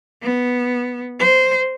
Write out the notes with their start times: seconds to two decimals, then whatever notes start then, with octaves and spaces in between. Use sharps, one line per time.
0.22 B3
1.19 C5